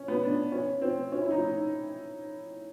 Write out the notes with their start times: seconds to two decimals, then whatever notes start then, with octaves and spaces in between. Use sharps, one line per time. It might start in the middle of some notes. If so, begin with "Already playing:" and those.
Already playing: C#4
0.08 B3
0.23 D4
0.52 C#4
0.81 C4
1.12 C#4
1.21 E4
1.31 D#4